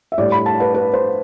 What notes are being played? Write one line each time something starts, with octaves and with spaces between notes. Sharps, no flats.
E5
A2 G3 D5
B5
A5
B4
B4
C5